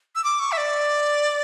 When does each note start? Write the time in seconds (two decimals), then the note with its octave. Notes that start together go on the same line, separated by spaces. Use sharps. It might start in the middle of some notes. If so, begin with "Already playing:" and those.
0.15 E6
0.24 D6
0.40 C#6
0.52 E5
0.57 D5